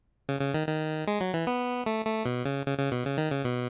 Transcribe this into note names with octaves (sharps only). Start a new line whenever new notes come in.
C#3
C#3
D#3
D#3
G#3
F#3
E3
B3
A3
A3
B2
C#3
C#3
C#3
B2
C#3
D#3
C#3
B2